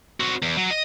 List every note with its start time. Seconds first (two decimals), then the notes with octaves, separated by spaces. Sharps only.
0.20 C4 F#4
0.42 E2
0.57 F#3
0.71 D#5